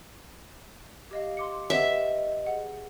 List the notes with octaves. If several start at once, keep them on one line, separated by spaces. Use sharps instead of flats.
G4 D#5 F5
C6 D6 C#7
G4 B4 D#5 E5 F#5
G#4 F#5